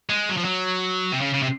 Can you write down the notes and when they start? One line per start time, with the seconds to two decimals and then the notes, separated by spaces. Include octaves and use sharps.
0.10 G#3
0.29 F#3
0.37 F3
0.45 F#3
1.12 C3
1.21 C#3
1.34 C#3
1.43 C3